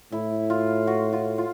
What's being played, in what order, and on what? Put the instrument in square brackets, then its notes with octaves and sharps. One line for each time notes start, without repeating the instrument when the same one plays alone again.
[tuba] A2 [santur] E4
[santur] F4
F#4
F4
F4